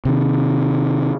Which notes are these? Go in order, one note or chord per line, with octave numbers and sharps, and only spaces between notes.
C3 D#3